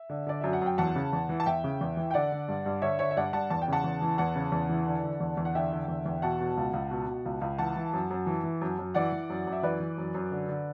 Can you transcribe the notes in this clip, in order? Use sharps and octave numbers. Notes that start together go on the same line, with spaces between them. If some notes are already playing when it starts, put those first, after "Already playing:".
Already playing: E5
D3
D3 D5
F#2 E5
F#5
F#2 G5
E2 F#5 A5
C#3
E2
E3
A5
E2 E5 G5
C#3
E2
E3
G5
D3 D5 F#5
D3
G2
G2
D3 C#5 E5
D3 C#5 E5
E5
G2 D5 F#5
G2 F#5 A5
E2 A5
G5
C#3 F#5 A5
E2
E3
E2 F#5 A5
C#3
E2
E3
D3
D3
E2
E2
F#5
D3 E5 G5
D3
E2
E2
B2 F#5 A5
B2
C#2
C#2
B2
B2
C#2
C#2
E3 F#5 A5
E3
F#2
F#2
E3
E3
F#2
F#2
E3 D5 F#5
E3
F#2
F#2
E5
E3 B4 D5
E3
F#2
F#2
D3
D3